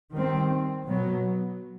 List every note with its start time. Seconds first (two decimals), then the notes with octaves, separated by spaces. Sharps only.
0.13 D#3 G3 C4
0.85 B2 F#3 B3